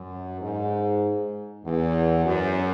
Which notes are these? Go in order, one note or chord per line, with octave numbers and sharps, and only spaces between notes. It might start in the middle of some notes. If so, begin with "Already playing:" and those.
Already playing: F#2
G#2
E2
F#2